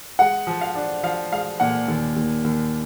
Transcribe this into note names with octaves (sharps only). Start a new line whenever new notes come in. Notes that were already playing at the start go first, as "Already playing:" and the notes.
G#3 F#5
F3
F5
D4
F3 F5
G#3 F5
A#2 F#5
D#2
D#2
D#2